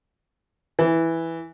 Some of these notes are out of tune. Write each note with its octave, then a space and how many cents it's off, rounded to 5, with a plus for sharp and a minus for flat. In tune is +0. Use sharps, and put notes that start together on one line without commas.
E3 +0